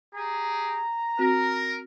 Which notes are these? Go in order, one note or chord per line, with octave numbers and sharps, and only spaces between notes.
G4 G#4 A#5
C4 F#4 A#4